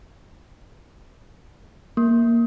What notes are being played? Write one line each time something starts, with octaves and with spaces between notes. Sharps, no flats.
A#3